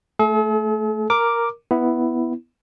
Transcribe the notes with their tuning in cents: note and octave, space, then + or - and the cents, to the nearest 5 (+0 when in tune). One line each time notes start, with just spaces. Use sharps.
A3 +0 A4 -45
A#4 +0 D6 +0
B3 +0 E4 +0